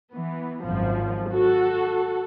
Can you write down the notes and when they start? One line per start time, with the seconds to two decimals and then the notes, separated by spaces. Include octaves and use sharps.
0.14 E3 B3
0.63 G#1 F#2 F3
1.30 F#4 A4